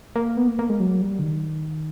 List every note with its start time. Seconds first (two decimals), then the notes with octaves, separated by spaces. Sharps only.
0.16 A#3
0.37 B3
0.48 A#3
0.59 A#3
0.70 G#3
0.80 F#3
1.02 G3
1.19 D3
1.23 D#3